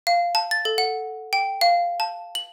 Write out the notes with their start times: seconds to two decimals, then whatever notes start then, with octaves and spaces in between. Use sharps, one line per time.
0.07 F5
0.35 A5
0.51 A6
0.65 A4
0.78 F#5
1.33 G5
1.61 F5
2.00 A5
2.35 F#7